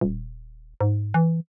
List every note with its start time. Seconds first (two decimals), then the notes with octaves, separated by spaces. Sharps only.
0.01 D#1
0.81 G#2
1.14 E3